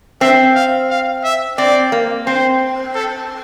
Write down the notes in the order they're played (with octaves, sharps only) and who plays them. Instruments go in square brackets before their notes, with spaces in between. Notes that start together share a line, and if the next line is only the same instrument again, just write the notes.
[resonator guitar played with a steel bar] C4 [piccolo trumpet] E5
[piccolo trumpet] F5
F5
E5
[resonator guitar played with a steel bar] C4 [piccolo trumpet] D5
[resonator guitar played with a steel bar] A#3
[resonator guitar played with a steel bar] C4 [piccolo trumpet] C5
[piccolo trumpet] A4